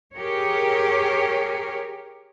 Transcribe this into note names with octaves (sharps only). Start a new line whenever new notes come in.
G4 G#4 A#4 C#5